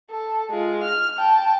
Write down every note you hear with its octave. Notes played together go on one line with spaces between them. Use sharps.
A4
G#3 F4
F6
G5 A5